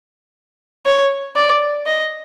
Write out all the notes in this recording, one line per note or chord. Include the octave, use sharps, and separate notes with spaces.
C#5
D5
D#5